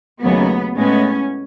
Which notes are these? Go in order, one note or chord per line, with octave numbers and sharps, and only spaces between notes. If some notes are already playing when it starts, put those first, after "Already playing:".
D#2 C#3 F#3 A3 B3
A2 G#3 B3 C#4